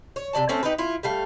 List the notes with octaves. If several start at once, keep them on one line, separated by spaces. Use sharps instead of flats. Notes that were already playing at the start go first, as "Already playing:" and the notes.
C#5
C3 E3 D5 A5
A3 C4 C#4 A4
D#4 G4 B4
E4 F4
G3 A3 F5